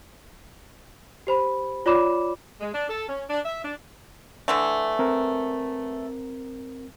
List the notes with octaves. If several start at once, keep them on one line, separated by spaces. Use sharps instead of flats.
G4 C5 B5
F4 C#5 D5 B5 D6 E7
G#3
D4
A4
C#4
D4
E5
D4
D3 E3 A3
C4 A#4